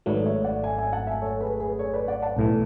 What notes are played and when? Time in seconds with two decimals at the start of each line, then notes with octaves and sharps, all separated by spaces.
0.06 G#1 G#2 F#3 A3 B4 D5
0.25 C#5 E5
0.44 D5 F#5
0.64 E5 G#5
0.78 E5 G#5
0.93 F#5 A5
1.07 E5 G#5
1.22 A4 C#5
1.41 G#4 B4
1.60 G#4 B4
1.79 A4 C#5
1.93 B4 D5
2.08 D5 F#5
2.22 F#5 A5
2.37 B1 A2 E3